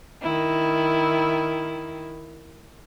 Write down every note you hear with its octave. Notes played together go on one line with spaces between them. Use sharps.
D#3 E4